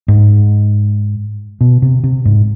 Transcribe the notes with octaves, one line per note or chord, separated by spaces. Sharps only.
G#2
B2
C3
C3
G#2